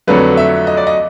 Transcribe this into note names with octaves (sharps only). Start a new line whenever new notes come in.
F2 D3 F#3 A3 B4
E5
D#5
D5
D#5